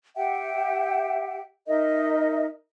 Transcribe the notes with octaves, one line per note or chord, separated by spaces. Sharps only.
G4 E5 F#5 G5
D#4 A#4 D#5 E5